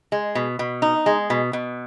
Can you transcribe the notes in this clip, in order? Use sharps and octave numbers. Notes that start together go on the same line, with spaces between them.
G#3
B2
B2
D#4
G#3
B2
B2